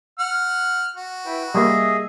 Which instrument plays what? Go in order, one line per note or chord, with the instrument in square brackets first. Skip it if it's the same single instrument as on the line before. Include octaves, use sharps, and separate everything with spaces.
[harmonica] F#5 F6
F#4
[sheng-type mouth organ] E4 B4 G5
[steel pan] G3 A#3 [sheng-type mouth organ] G#4 D#5 E5 [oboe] D#6